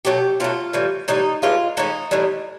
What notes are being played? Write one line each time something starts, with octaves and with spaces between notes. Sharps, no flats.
B2 F#3 A3 G4
B2 F#3 A3 F4
A2 E3 G3
A2 E3 G3 D#4
A2 E3 G#3 C#4 F4
A2 E3 G#3 C#4 D#4
A2 E3 G3